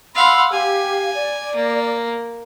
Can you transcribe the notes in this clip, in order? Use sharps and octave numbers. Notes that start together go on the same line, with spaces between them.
F5 F#5 B5 C6 E6
G4 F5 G#5
D5
A#3